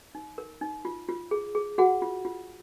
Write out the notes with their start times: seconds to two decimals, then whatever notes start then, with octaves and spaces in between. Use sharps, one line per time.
0.15 D#4
0.38 A#4
0.61 D#4
0.85 F4
1.09 F4
1.31 G#4
1.55 G#4
1.78 F#4 G#4 F#5
2.02 F4
2.25 F4